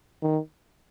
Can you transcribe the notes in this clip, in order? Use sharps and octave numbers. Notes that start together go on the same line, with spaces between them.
D#3